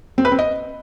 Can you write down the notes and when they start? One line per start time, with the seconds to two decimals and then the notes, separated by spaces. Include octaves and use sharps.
0.18 C4
0.25 B4
0.32 C4
0.39 D#5